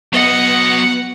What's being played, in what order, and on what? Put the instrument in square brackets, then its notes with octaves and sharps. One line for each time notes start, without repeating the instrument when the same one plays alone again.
[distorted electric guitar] F#3 D#5 [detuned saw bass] B3 [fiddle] F#5